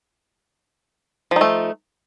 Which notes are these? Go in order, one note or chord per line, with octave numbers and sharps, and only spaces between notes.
F3 A3 D#4